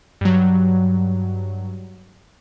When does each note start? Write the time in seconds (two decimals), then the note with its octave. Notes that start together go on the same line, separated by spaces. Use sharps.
0.21 G2 F#3